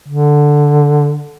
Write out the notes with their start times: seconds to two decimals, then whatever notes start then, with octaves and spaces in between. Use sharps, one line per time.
0.08 D3